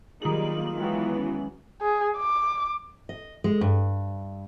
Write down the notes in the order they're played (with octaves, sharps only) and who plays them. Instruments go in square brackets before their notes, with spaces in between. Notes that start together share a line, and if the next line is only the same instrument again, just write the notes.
[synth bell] D#3 F#7 [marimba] F#3 G#4 [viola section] G3 A#3 D#4 [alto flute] F4
[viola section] E3 F#3 B3 [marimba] G#3 F5 G5
[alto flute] C#4
[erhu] G#4
D6
[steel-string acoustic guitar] D#5
G#3
G2